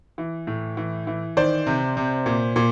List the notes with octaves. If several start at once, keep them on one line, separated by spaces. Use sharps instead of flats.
E3
A2
E3
E3
D#3 C5 D5
C3
C3
A#2
A#2